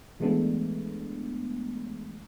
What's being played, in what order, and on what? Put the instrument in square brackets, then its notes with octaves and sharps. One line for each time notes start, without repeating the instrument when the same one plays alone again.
[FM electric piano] E3 G#3 A3 B3 D4